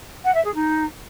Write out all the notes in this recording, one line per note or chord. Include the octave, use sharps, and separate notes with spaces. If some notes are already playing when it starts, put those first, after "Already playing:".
F#5
E5
G#4
D#4